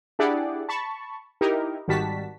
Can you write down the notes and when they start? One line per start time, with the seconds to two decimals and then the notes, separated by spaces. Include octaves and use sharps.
0.19 D4 E4 G4 G#4 D5 F#5
0.69 A5 B5 C#6
1.41 D#4 E4 G4 A#4
1.88 G#1 D#3 G3 F#4 A5 B6